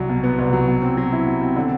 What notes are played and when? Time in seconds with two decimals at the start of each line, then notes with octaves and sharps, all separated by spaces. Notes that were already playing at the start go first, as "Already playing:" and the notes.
Already playing: C2 F#3
0.09 B2
0.24 B3
0.39 C2
0.53 F#3
0.68 B2
0.82 C4
0.97 F#3
1.12 E4
1.26 B2
1.41 C4
1.56 D3